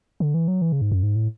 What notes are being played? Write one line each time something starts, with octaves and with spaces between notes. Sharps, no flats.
D3
E3
F#3
E3
C#3
G#2
F#2
G#2
A2